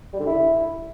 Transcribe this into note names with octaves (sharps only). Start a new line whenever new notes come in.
G3
D3
E4